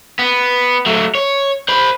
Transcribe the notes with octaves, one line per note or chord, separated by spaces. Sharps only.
B3
F#3 A3
C#5
C5 B5